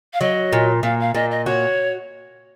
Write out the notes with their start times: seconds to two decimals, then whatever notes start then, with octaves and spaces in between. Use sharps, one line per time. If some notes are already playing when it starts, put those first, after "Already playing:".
0.13 F5
0.21 F#3 D#5
0.53 A#2
0.83 A#2 F5
1.00 F5
1.15 A#2 D#5
1.31 D#5
1.46 F#4 C#5